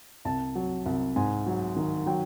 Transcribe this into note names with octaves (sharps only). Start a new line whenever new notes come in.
C2 A5
F#3
C2
G#2 G#5
F#3
D#3
F#3 G5